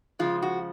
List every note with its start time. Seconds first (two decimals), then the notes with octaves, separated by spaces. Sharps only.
0.19 C#3 F3 G#3 F4
0.42 F#4